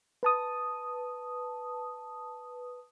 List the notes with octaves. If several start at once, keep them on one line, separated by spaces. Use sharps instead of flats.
B4 A5 D#6